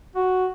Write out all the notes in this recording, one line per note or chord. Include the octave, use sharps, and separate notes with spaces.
F#4